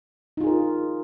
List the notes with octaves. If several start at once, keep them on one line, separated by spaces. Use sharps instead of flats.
D#4 F4 G#4 A#4